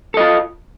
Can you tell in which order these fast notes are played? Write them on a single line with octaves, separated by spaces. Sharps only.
A4 D#5 F4